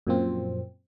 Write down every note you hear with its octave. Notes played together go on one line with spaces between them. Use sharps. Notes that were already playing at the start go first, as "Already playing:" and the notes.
F#2 A#2 F3 C4